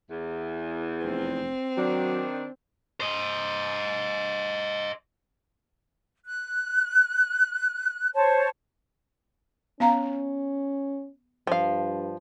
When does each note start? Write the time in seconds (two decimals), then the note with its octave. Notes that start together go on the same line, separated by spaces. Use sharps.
0.10 E2
1.04 F1 C4
1.77 D#3 F#3 D4
3.00 C5 D#5
6.25 F#6
8.14 C5 C#5 A5
9.80 B3 C#4 F5 A#5
11.47 G2 F3 F5